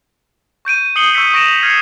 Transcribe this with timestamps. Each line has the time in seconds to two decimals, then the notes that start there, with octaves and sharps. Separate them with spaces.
0.65 C#6 G6 D7 D#7
0.96 D#6 C7 C#7 F#7 G7
1.14 C#6 E6 G6 B6 C#7
1.34 C#6 A#6 D7 E7 F7
1.61 F6 G#6 C7 C#7 D#7